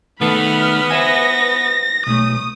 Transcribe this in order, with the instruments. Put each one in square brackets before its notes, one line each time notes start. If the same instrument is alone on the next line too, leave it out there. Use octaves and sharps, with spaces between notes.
[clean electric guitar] D#3 A3 A4 [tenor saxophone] B3 [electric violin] B5 F6
[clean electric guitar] C5 E5 G#5 [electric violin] A#6
[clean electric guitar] B1 A3 [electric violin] D#6